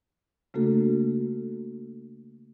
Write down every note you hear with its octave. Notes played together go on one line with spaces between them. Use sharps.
C#3 A3 A#3 D4 F#4 A4